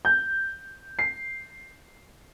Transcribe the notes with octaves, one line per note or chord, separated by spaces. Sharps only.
G6
C7